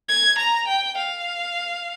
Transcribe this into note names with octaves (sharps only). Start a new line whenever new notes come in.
G#6
A#5
G5
F5